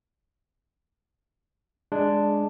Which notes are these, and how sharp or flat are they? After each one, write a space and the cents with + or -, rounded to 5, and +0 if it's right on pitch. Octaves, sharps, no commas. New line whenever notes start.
G#3 +0 D4 +0